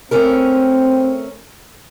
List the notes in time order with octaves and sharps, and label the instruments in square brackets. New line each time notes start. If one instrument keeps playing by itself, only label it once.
[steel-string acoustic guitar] A3 C#4 A#4 [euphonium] C4